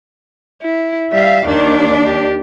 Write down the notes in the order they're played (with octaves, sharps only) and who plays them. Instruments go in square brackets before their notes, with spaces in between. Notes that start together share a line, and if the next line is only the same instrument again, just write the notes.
[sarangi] E4
[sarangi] G3 [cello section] E5 F5
[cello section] D#2 D4 [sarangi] D#3
[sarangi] G4